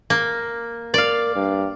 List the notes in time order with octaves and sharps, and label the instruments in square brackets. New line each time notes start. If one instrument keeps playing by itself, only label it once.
[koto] A#3
[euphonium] A#4 [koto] D5 F5
[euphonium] G2